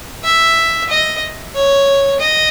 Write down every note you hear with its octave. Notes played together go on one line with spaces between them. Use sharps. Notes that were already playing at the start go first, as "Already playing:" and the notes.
E5
D#5
C#5
D#5